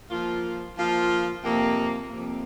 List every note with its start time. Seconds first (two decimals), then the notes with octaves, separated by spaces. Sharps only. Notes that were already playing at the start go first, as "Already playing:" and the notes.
0.09 F3 A#3 F4
0.77 F3 A#3 F4
1.44 F2 C3 A#3
2.10 F2 C3 A#3